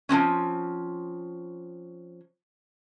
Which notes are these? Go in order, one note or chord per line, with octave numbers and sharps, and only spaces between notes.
F3 G#3 C4 C#4